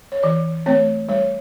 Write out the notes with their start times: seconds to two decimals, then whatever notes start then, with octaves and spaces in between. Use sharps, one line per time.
0.12 C#5
0.23 E3 D5
0.66 A3 C4 C#5
1.09 G3 C#5